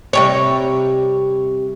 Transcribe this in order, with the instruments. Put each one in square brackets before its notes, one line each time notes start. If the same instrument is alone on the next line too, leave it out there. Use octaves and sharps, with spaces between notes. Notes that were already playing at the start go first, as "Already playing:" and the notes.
[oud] C3 G3 C#5